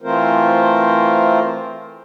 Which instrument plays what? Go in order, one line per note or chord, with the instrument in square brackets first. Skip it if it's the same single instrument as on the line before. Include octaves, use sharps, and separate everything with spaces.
[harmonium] E3 A3 C4 F4 A#4 C5